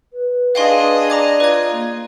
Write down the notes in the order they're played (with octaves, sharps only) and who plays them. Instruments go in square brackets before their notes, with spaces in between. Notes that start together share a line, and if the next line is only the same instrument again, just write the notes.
[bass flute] B4
[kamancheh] D4 G#4 [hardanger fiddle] D#5 [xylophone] F5 G5 C6
[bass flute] D5 [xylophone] A#5 D6 G#6
[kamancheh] F4 [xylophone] B4 G#6
[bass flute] A#3